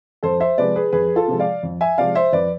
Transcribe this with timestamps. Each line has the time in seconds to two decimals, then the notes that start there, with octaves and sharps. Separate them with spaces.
0.23 F2 A4 C5
0.40 C5 E5
0.58 C3 F3 G#3 B4 D5
0.76 G#4 B4
0.92 F2 G#4 B4
1.16 F4 A4
1.28 C3 F3 G#3
1.39 D5 F5
1.63 F2
1.81 E5 G#5
1.98 C3 F3 G#3 D5 F5
2.15 C5 E5
2.33 F2 B4 D5